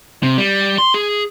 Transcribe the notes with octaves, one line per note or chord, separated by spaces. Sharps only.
C3
G3
C6
G#4